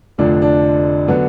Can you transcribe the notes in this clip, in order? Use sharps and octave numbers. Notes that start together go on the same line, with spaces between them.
F1 F2 D3 F3 D4
D4
D3 F#3 B3